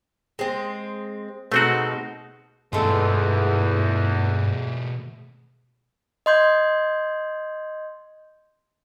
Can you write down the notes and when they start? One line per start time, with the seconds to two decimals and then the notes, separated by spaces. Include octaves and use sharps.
0.39 G#3 C4
1.52 B2 G#3 A3 C4 D#4 F#4
2.73 E2 G2 B2 G#3 A3 C4 F4
6.26 D#5 C6 G6 G#6